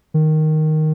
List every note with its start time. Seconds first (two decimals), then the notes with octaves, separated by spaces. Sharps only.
0.14 D#3